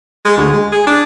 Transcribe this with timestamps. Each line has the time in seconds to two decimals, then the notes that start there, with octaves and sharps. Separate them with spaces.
0.25 G#3
0.37 D2
0.53 G#3
0.72 G#4
0.87 D4